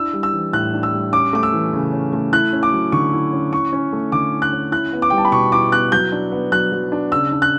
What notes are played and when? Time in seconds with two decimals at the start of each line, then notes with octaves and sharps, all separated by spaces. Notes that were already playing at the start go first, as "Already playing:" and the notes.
Already playing: D4 E4 E6
0.13 G3
0.23 E6
0.33 E3
0.53 A2 F#6
0.74 D4
0.83 E6
0.93 G3
1.13 C#4 D6
1.33 A3 D6
1.43 E6
1.53 E3
1.73 C#3
1.93 C#4
2.13 A3
2.33 E4 F#6
2.53 C#4
2.63 D6
2.73 F#3
2.92 D3 C#6
3.13 E4
3.33 C#4
3.52 E4 C#6
3.73 C#4
3.92 A3
4.12 D3 D6
4.32 E4
4.42 F#6
4.52 C#4
4.72 E4 F#6
4.93 B3
5.02 D6
5.10 G3 G5
5.18 A5
5.25 B5
5.32 B2 C#6
5.52 E4 D6
5.72 B3 F#6
5.92 F#3 G6
6.12 D4
6.32 B3
6.52 F#3 F#6
6.72 F#3
6.92 D4
7.12 C#3 E6
7.32 D4
7.42 F#6